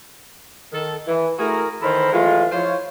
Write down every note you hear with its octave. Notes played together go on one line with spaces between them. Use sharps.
D#3 A4
E3
A3 E4 F#4 G#4 A#4
D#3 E3 A4 A#4 C5 B5
E3 F#3 G#3 A3 F4
F3 E4 F4 C5 C#5